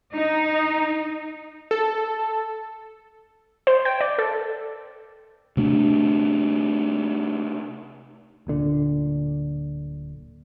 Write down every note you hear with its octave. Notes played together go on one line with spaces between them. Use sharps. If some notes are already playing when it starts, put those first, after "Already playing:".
D#4
A4
C5
G5
D5
A4
C3 A3 D4
D1 A#2 D3